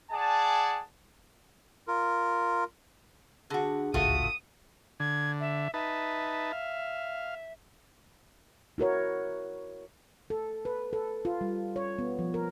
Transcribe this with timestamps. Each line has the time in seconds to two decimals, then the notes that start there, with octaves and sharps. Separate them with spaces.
0.11 G#4 D5 F#5 G#5 A5
1.88 F4 A#4
3.50 D3 F#4 G#4
3.94 D1 G#1 C#2 A3 F4 F#4 D#6
5.00 D3 G#6
5.40 E5
5.74 D#4 B4 E5 A5
6.52 F5
8.78 E4 F#4 A#4 C#5
10.30 A4
10.65 B4
10.93 A4
11.25 F4
11.41 G3
11.76 C#5
11.99 B3
12.19 F3
12.34 A#4